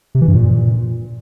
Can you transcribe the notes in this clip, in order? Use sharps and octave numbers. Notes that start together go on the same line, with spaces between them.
C3
E3
G2
A#2